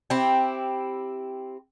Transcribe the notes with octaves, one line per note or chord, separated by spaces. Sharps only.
C4 E4 G4